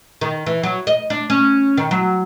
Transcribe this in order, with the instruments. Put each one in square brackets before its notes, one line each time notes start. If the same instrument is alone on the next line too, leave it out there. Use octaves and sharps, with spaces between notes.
[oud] D#3
E3
F#3
D#5
D4
C#4
D#3
F#3